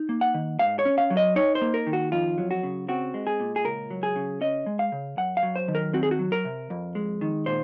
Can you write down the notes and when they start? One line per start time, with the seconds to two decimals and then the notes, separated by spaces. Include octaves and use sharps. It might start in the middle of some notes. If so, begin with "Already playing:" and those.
Already playing: D#4
0.09 A#3
0.21 F#5
0.34 D#3
0.59 G#2 F5
0.79 C#5
0.85 C#4
0.98 F5
1.10 F#3
1.17 D#5
1.36 D#4 C#5
1.55 C5
1.61 A#3
1.74 A#4
1.87 D#3
1.93 F#4
2.12 F2 F4
2.38 F#3
2.51 F#4
2.63 C#3
2.88 C4 F#4
3.14 G#3
3.27 G#4
3.40 A#2
3.56 G#4
3.64 C#2 A#4
3.90 F#3
4.03 G#4
4.16 C#3
4.41 C#4 D#5
4.66 G#3
4.79 F5
4.92 C#3
5.17 F#2 F#5
5.37 F5
5.43 F#3
5.56 C5
5.68 D#3
5.75 A#4
5.93 C4 F#4
6.03 G#4
6.11 F#4
6.19 F#3
6.32 A#4
6.45 C3
6.70 F2
6.95 G#3
7.21 D#3
7.46 A#2 C5